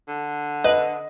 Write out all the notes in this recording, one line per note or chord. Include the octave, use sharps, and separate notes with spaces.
D3
B4 D#5